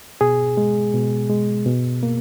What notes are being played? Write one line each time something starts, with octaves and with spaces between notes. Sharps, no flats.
B2 G#4
G#3
B2
G#3
B2
A#3